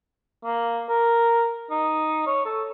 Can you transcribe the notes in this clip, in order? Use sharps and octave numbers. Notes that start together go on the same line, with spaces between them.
A#3
A#4
D#4
C#5
A4